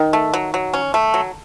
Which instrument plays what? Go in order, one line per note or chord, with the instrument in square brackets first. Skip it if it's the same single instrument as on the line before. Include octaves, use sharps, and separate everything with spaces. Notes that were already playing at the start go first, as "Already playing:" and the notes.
Already playing: [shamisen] D#3
[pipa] A3
F#3
F#3
C#4
A3
F#3